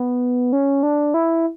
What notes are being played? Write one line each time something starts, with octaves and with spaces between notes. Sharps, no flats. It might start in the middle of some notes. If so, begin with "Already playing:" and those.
Already playing: B3
C#4
D4
E4